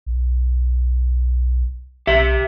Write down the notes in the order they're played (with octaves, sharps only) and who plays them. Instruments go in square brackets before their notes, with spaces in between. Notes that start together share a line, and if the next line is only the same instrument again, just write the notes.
[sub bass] B1
[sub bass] B1 [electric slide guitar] G4 E5